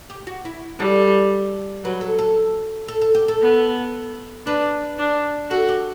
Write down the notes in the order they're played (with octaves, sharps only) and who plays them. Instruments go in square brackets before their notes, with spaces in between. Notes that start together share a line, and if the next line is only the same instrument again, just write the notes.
[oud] G4
F#4
E4
[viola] G3 [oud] A4
[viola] F#3 [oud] B4
[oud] A4
A4
A4
A4
G4
A4
[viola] B3
[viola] D4 [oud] B4
[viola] D4
[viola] F#4 [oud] A4
[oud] G4